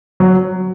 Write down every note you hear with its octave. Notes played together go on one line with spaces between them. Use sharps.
F#3